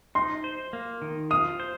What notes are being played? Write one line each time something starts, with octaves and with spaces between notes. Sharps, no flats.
D#4 C6
C5
A#3
D#3
F4 D#6
C5